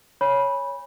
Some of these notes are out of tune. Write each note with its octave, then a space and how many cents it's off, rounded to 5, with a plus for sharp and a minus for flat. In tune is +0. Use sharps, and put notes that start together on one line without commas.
C#5 +0 G#5 -15 B5 -15